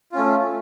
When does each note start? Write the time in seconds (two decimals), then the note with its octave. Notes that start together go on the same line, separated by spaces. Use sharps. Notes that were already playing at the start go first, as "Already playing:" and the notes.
0.12 F4
0.15 C#4
0.18 A3